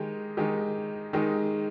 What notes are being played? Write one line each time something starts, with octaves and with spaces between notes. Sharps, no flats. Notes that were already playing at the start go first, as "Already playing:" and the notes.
Already playing: D#3 G#3 D#4 G4
D#3 G#3 D#4 G4
D#3 G#3 D#4 G4